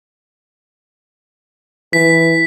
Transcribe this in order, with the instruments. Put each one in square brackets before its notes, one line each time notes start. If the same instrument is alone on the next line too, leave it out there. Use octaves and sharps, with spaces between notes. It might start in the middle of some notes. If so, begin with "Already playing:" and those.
[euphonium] E3 [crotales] B6